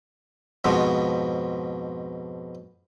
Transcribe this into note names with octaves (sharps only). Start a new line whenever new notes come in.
F2 G#2 B2 F3